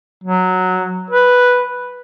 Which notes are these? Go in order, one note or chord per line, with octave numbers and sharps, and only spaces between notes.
F#3
B4